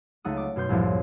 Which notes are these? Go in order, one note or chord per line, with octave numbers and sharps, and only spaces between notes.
C#2 A3 D#4 F#5 D#6
D6
F#2 B2 C6 G6
C2 F#2 A2 F3